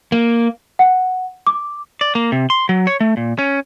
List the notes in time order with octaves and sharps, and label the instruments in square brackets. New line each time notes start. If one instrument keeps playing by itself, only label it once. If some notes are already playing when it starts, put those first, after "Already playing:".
[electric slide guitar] A#3
[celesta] F#5
D6
[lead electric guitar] D5
A#3
C3
C6
F#3
C#5
A3
A#2
C#4